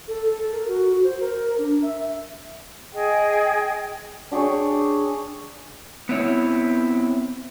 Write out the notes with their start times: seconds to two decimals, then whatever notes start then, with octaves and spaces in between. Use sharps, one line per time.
0.08 A4
0.25 A4
0.52 A#4
0.68 F#4
0.90 F#4
1.04 C5
1.20 A#4
1.58 D4
1.82 E5
2.93 G#4 D#5 G5
4.31 D4 G4 G#4 C#5
6.09 B3 C4 E4 C#5